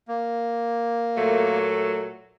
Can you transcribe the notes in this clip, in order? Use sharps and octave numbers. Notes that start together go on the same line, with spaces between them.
A#3
A#2 F#3 A3